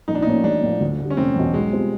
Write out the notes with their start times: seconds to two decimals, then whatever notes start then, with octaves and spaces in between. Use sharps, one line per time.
0.08 A#1 D#4
0.15 D4
0.22 D#4
0.27 A2 F3 A#3 C#4
0.44 A1 D4
0.63 A2 F3
0.81 D2
1.00 D3 G3
1.10 C#4
1.17 F1 C4
1.36 E2 B2
1.54 B1 G#3
1.73 B2 G3 C4 F4